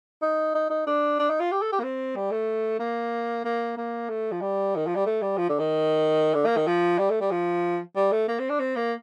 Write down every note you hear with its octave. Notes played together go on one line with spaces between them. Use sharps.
D#4
D#4
D#4
D4
D4
D#4
F4
G4
A4
G4
A#3
C4
G3
A3
A#3
A#3
A#3
A3
F3
G3
D#3
F3
G3
A3
G3
F3
D3
D#3
D3
A#3
D#3
F3
G3
A3
G3
F3
G3
A3
A#3
C4
D4
C4
A#3